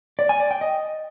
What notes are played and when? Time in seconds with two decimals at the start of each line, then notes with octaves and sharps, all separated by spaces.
0.19 D5
0.29 G#5
0.40 D5
0.51 G5
0.61 D#5